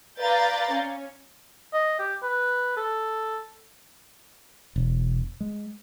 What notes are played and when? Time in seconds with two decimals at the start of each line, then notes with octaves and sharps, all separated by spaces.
0.20 B4 D5 F5 A#5 G6 A6
0.73 C#4
1.73 D#5
1.99 G4
2.23 B4
2.77 A4
4.76 E1
5.40 G#3